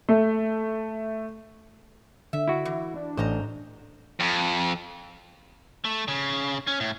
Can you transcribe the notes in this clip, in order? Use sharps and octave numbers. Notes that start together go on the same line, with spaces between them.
A3
D3 E5
E4 F#4
E3
D4
A1 C5 D#5 A#5
F2
A3
C#3
C#4
A2